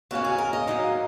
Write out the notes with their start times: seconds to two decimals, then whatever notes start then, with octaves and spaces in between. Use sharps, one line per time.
0.11 D#2 C#3 A#3 C#4 F#4
0.25 G#4
0.38 A#4
0.53 D#5
0.67 G#2 F#3 A#3 D#4